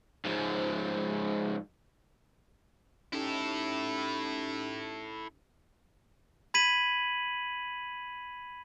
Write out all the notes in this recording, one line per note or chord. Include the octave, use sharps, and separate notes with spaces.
G#2 F3
C#4 D#4 E4 G4 A4
B5 G#6 B6 D#7 F#7